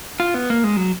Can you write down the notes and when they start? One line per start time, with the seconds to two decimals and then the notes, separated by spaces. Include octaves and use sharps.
0.20 F4
0.34 B3
0.50 A#3
0.64 G#3
0.77 F#3